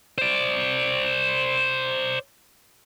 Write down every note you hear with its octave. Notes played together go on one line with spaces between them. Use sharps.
C5 D5